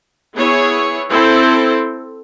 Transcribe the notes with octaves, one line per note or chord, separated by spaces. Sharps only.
B3 E4 G#4 C#5
C4 E4 A4 C5